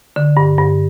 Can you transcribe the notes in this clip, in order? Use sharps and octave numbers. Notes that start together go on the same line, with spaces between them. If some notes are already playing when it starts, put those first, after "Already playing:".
D3
G2
G2